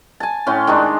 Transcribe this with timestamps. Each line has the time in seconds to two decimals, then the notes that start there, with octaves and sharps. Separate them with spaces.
0.20 G#5 A5
0.47 A2 C#4 C6
0.67 D#3 G#3 D4 D#4